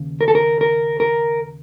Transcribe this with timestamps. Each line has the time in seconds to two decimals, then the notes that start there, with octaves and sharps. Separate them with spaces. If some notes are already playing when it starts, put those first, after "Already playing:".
Already playing: D#2 C#3
0.21 A#4
0.28 A4
0.35 A#4
0.61 A#4
1.00 A#4